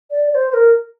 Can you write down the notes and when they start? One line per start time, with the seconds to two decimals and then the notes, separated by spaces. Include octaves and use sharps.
0.11 D5
0.30 D5
0.35 C5
0.50 C5
0.54 A#4